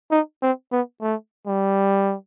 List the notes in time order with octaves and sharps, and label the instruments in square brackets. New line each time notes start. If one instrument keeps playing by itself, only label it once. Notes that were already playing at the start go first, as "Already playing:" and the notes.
[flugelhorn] D#4
C4
B3
A3
G3